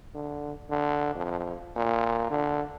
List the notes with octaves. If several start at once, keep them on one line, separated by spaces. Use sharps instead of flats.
D3
D3
F2
A#2
D3